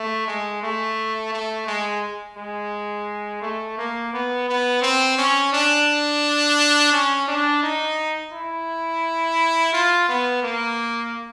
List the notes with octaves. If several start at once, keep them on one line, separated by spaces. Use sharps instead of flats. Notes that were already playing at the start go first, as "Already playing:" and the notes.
Already playing: A3
G#3
A3
A3
G#3
G#3
A3
A#3
B3
B3
C4
C#4
D4
C#4
D4
D#4
E4
F4
B3
A#3